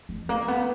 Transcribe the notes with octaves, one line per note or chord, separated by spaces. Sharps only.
G#3
A#3
B3